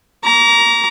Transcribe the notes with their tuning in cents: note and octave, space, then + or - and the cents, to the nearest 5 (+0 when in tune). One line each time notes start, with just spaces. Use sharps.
A#5 +10 D6 -35